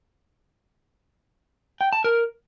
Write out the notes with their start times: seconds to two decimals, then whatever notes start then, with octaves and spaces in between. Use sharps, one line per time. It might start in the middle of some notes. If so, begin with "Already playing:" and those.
1.81 G5
1.93 A5
2.04 A#4